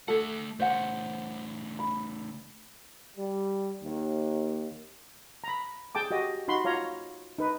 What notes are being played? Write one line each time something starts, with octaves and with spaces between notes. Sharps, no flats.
A3 A4 F#5
C#3 A3 C5 F#5 G#5
B5
G3
D#2
A#5 B5
G#4 G5 A5 D6
F#4 G4 D#5
D#4 F#4 B5 C6
F4 C#5 F5 A#5
D#4 B4